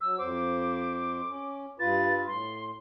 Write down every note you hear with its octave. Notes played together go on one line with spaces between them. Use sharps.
F#3 E6
F2 C5 D6
C#4
G2 F4 B4 A6
A2 C6